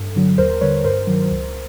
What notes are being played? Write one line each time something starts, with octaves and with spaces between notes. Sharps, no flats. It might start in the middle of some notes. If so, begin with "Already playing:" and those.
Already playing: G2 A4
D3 F#3
D#2 A#4 C5
D3 G3 B4 C#5
G2 A#4 C5
D#3 F#3
C#2